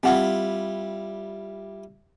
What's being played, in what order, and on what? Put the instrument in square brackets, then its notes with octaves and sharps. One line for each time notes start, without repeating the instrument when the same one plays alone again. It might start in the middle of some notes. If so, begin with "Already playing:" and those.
[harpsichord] G3 E4 F4 [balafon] C4 F#5